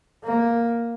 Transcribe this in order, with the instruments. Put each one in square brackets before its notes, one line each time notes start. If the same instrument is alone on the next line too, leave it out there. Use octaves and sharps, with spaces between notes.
[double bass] A#3